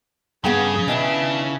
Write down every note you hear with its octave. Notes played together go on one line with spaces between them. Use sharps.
G2 C#3 B3 G#4 F5 G5
B2 D#3 E3 D4 E5